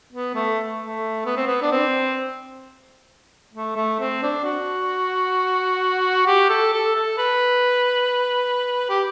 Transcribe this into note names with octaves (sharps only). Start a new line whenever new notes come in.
B3
A3
A3
B3
C4
B3
D4
C4
A3
A3
C4
D4
F#4
G4
A4
A4
A4
B4
G4